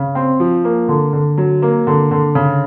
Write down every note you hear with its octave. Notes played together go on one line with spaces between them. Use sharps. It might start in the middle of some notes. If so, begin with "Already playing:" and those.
Already playing: C#3
C4
F3
A#3
D3
D3
F#3
A#3
D3
D3
C#3